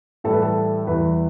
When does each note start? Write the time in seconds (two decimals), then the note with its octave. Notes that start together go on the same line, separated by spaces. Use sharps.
0.24 A2 E3 G3 A4
0.33 B4
0.42 A4
0.87 E2 E3 G3 B4